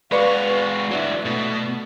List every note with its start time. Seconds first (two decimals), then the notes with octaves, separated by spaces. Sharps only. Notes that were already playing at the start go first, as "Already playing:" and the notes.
0.12 G#3 F#4 B4 D5 F5 C#6
0.91 F#3 D4 E4
1.26 B2 A3